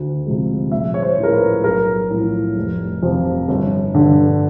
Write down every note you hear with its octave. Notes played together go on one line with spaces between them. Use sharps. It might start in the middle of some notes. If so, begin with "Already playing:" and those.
Already playing: D2
C3 F3 G#3
A#1 E5
C#5
C5
A2 F3 A#4
B4
B1 A#4
A2 F3
F1
F2 C3 F3
G1
G2 D3